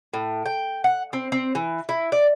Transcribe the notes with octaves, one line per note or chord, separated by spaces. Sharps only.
A2
G5
F#5
C4
C4
E3
E4
D5